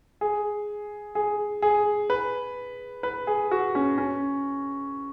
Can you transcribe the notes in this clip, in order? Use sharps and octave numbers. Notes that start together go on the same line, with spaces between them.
G#4
G#4
G#4
B4
B4
G#4
F#4
C#4
C#4